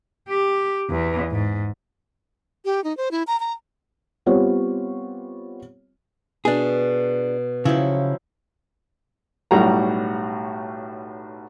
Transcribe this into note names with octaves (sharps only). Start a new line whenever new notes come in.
G4
E2
G#2
G4
D#4
C5
E4
A#5
A#5
G3 B3 C4 F4 G4 C#5
B2 D4 G#4
C#3 F3 F#3 E4
B1 A2 G3 F#4 A#5